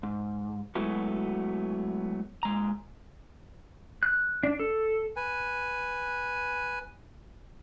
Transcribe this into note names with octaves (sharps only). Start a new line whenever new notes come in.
G#2
F#3 G#3 A3 B3 E4 F#4
A#2 G#3 A#5
F#6
D4
A4
B4 G#5